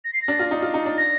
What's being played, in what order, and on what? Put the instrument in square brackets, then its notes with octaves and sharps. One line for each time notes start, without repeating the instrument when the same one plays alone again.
[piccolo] A#6
C7
A#6
[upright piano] D4
F4
D#4
F4
D#4
D4
[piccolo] A#6